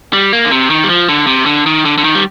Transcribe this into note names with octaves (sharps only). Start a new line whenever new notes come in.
G3
A#3
D3
C3
D#3
G3
F3
D3
C3
D3
D#3
D3
D3
D#3
G3